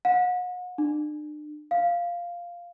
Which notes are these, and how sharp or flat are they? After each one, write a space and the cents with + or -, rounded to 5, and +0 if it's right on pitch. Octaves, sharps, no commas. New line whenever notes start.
F#5 -40
D4 +40
F5 -5